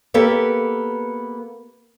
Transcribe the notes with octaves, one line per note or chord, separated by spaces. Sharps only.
A#3 B3 G4 A4 A#4